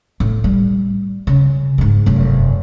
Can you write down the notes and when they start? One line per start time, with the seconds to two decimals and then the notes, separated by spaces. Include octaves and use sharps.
0.20 A2
0.44 G3
1.27 C#3
1.78 G#2 G#3
2.06 F1 F#2